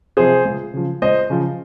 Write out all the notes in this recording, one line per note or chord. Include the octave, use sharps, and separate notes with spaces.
C3 F3 G#4 C5
C#2
C#3 F3
C#2 C5 D#5
C#3 F3